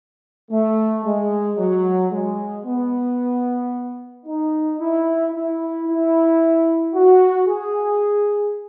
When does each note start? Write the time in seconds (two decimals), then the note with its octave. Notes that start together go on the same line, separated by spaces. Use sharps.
0.51 A3
1.04 G#3
1.58 F#3
2.11 G#3
2.65 B3
4.26 D#4
4.80 E4
5.33 E4
5.88 E4
6.94 F#4
7.47 G#4